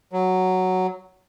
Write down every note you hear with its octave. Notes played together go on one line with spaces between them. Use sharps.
F#3